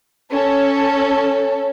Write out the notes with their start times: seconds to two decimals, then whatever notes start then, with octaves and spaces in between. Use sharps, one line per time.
0.32 C#4 A4